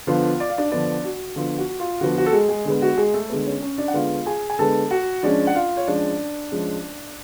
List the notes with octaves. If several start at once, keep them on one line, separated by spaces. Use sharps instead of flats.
D3 F3 B3 F4 F5
D5
F5
D4 D5
D3 F3 B3 D4 D5
F#4
D3 F3 B3 F4
F#4
F4
D3 F3 B3 F#4
F#4
A4
G#3 G#4
G#3 G#4
D3 G#3 B3
F#4
G#3 G#4
A3 A4
D3 G#3 B3
C#4 C#5
C#4 C#5
D4 D5
F#5
D3 G#3 B3 F4 F5
G#4 G#5
G#5
D3 G#3 B3 A4 A5
F#4 F#5
F3 G#3 C#4 D4 D5
F#5
F4 F5
C#5
F3 G#3 C#4 D4 D5
F3 G#3 C#4